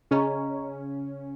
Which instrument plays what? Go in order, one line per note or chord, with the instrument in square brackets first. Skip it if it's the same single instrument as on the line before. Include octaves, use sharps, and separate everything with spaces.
[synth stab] C#3 C#4 [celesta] G#4 D#5 A#5 C#6